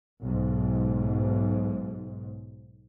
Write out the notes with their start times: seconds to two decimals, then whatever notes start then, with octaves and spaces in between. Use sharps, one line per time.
0.20 B1 G#2